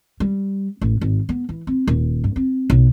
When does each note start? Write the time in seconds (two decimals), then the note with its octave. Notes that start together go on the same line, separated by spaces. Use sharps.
0.20 G3
0.81 A1
1.01 G#1
1.29 B3
1.49 E3
1.67 C4
1.87 D#1
2.24 G2
2.36 C4
2.70 B1